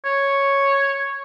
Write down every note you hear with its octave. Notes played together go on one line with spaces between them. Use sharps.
C#5